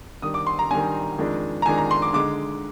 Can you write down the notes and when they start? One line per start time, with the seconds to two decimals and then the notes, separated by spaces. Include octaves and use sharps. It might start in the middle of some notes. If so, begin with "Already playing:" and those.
0.22 D#3 G3 D4 D#6
0.34 D6
0.47 C6
0.59 A#5
0.71 D#3 G3 D4 G#5
1.18 F2 D#3 G#3 D4
1.62 A#5
1.66 F2 D#3 G#3 D4 G#5
1.78 A#5
1.91 C6
2.02 D6
2.13 D3 G#3 D#4 D6